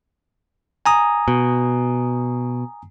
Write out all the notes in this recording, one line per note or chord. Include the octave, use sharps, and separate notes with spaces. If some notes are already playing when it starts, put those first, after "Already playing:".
G#5 A#5 D#6
B2